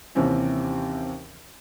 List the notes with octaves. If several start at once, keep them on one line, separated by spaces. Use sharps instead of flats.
D#2 C3 E3 C4 C#4